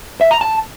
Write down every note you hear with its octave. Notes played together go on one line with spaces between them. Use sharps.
E5
A#5
A5